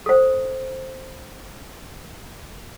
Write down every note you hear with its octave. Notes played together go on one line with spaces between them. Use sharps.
A4 C5